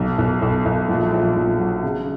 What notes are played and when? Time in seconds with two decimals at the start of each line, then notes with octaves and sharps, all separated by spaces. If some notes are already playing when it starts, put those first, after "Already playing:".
Already playing: B1
0.18 B1
0.42 B1
0.66 B1
0.89 A#1
1.12 A#1
1.36 A#1
1.59 F#3
1.83 C#3